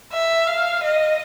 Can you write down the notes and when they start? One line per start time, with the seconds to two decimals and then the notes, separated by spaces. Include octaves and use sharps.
0.12 E5
0.47 F5
0.83 D#5